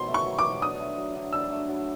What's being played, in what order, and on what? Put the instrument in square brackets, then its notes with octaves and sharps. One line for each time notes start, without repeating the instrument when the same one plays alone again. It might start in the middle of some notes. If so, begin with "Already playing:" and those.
Already playing: [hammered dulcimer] B2 F#3 [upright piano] C6
[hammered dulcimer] A3
[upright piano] C#6
[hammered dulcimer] F#3
[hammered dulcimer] B2 [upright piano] D6
[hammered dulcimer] D4 [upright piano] D#6
[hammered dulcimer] A3
F#3
D3
[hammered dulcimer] D4 [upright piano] E6
[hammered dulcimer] A3
F#3